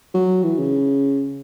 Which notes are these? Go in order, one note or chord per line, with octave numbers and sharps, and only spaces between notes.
F#3
E3
C#3